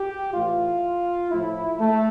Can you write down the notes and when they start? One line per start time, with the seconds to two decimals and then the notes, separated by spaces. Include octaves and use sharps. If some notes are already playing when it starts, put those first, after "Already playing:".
Already playing: G4
0.34 A2 E3 A3 F4
1.31 A2 F3 A3 E4
1.79 A3